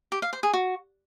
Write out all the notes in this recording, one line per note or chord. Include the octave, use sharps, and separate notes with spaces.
G4
F5
C5
G#4
F#4